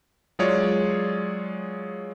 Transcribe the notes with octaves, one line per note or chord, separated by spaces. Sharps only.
F#3 G#3 F4 G#4 C#5 D5